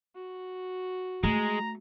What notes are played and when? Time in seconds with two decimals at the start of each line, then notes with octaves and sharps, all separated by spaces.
0.15 F#4
1.24 G#3 A3 A#5